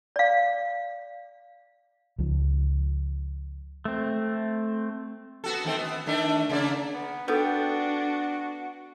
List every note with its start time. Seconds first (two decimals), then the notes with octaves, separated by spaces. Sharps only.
0.16 D5 F5
2.18 C#2 F3
3.85 A3 C4
5.44 B3 F#4 A4
5.65 D#3 A3 C4
5.79 B3
6.06 D#3 A3 D4
6.50 C#3 A#3 D5
6.94 B3
7.28 B3 D4 F#4 A4 B4 G5